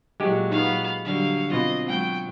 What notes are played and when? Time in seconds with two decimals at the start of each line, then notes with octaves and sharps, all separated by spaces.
0.20 A#2 F#3 G#3 G4
0.51 B3 D#4 F5
1.05 D3 F#3 G3 F5
1.52 B2 C4 F4 D#5
1.88 F#3 G#3 G5